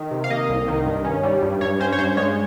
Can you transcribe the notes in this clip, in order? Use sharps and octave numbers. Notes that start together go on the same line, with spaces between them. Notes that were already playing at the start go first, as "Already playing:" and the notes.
Already playing: D#3
C3
F5
A#3 D#5
C2
D#3
G2
C#4
G3
G2
G2 C#5
C#4 C5
C#5
G2 C5
G#3 C#5